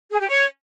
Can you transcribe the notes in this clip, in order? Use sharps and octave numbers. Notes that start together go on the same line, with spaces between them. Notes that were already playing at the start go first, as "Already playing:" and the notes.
G#4
G4
C#5